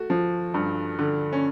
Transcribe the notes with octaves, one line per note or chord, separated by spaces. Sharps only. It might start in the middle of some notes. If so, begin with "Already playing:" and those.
Already playing: A3 F#4
F3
G2
D3
C#4